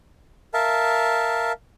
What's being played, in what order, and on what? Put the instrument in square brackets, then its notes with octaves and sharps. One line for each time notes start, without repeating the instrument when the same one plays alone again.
[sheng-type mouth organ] A#4 E5 F5 A5